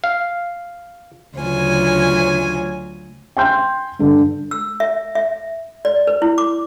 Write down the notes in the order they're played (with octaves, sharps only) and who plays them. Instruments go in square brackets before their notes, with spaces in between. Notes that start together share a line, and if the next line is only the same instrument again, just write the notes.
[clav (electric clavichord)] F5
[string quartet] D2 C#3 F#3 F4 C#5 G#5
[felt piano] G5 G#5 C6 G6
G2 D3
[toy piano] E6
E5
E5
D5
B4
E4
D6